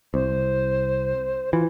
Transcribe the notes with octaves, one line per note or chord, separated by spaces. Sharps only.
C2 C5
E3 F4